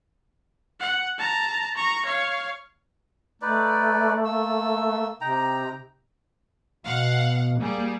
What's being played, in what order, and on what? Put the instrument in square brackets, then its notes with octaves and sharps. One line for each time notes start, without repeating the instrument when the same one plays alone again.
[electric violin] F#5
A5 A#5
A#5 C#6
C#5 F5
[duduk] A3 [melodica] D#4 B4 D5
[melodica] A#3 E6
[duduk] C3 [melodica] D#4 G5 A#5
[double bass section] B2 [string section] F5 F#5
[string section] G3 G#4 [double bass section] A#3